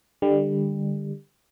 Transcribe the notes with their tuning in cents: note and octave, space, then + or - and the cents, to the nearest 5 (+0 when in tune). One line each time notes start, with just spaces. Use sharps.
D3 +15 G3 +25